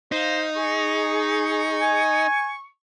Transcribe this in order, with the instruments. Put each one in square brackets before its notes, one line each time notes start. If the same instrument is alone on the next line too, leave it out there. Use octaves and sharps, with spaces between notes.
[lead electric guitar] D#4 [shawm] C5 [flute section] F5
[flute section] G#4 [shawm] C#6
[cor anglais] G#5